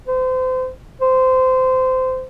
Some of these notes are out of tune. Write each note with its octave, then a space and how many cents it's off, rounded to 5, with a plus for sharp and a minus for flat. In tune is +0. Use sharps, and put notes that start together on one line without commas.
C5 -35
C5 -20